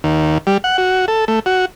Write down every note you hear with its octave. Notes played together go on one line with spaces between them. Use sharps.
D#2
G3
F#5
F#4
A4
A3
F#4